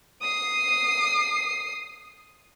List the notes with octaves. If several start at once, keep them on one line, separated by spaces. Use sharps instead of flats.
D#6 C7